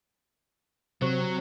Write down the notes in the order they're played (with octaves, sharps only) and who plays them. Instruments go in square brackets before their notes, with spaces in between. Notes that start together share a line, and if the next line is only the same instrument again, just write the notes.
[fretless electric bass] C3 [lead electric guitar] F#3 [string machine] C4 [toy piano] G4 C5